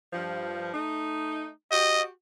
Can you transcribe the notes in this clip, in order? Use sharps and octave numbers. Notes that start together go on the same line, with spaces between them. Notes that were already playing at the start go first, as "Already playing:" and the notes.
G2 F3
A3 D#4
F#4 G4 D#5